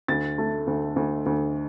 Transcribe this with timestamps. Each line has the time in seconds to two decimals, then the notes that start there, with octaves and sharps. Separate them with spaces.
0.08 D2 A6
0.38 A3
0.67 D2
0.96 D2
1.26 D2